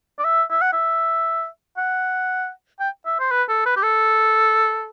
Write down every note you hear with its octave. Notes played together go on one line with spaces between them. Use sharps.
D5
E5
E5
F#5
E5
F#5
G5
E5
C5
B4
A4
B4
G4
A4